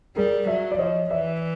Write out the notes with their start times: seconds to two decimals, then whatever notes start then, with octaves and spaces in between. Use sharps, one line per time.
0.16 G3 G#4 A#4
0.47 F#3 D5 E5
0.72 D5
0.78 F3 C#5 D#5
1.11 E3 D5 E5